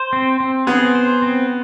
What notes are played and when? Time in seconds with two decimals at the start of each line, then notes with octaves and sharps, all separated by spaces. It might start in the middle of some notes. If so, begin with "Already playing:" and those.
Already playing: C5
0.13 C4
0.40 C4
0.67 B3 G#4
0.95 C5
1.22 C4